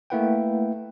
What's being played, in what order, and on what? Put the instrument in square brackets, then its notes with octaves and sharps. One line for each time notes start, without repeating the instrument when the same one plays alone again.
[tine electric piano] A3 A#3 E4 B4 F#5 G5